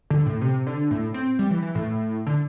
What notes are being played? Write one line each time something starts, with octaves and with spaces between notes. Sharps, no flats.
D3
A2
C3
D3
A2
C4
G3
E3
E3
A2
D3